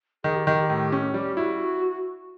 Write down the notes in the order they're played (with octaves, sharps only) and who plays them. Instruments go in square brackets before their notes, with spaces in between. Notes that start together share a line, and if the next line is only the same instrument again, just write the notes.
[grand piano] D#3 [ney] G#4
[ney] G4
[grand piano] D#3 [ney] G4
[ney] G4
[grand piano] A2
C#4
[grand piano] G3 [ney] G4
[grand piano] E4 [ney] F#4